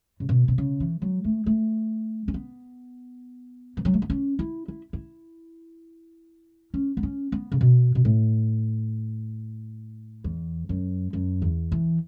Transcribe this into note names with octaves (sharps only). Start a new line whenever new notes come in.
C#3
B2
B2
C#3
E3
F#3
A3
A3
C#4
B3
E3
F#3
A3
B3
C#4
E4
E4
E4
C#4
B3
C#4
B3
C#3
B2
B2
A2
E2
F#2
F#2
E2
E3